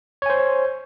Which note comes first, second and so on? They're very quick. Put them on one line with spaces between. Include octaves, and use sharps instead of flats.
C#5 G#5 C5